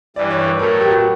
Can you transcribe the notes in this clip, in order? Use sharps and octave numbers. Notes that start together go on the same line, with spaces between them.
G2 E3 G3 D5
C#5
B4
A2 F#3 A3 A#4
G4
F#4